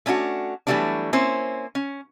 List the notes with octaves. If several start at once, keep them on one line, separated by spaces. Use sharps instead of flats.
A3 C#4 D4 F4 F#4
E3 F#3 G3 A3 B3 D4
A#3 C4 C#4 E4 C5
C#4